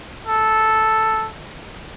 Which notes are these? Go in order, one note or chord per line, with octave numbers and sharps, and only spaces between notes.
A4